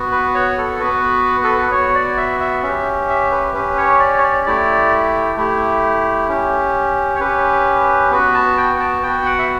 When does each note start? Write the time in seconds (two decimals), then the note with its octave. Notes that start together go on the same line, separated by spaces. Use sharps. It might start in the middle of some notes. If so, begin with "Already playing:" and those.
Already playing: B3 F#4
0.12 B4
0.34 C#5
0.58 A4
0.80 B3 F#4 B4
1.44 A4
1.58 B4
1.71 B3 F#4 C#5
1.95 D5
2.17 E5
2.40 E5
2.63 C#4 G4 E5
3.09 E5
3.31 B4
3.54 C#4 G4 B4
3.77 C#5
4.00 D5
4.18 C#5
4.23 D5
4.46 A3 E4 G4 D5
5.37 A3 E4 G4
6.28 C#4 G4
7.15 C#5
7.20 C#4 G4 B4
8.11 B3 F#4 B4
8.34 A5
8.58 G5
8.79 A5
9.02 B3 F#4 G5
9.26 F#5
9.39 E5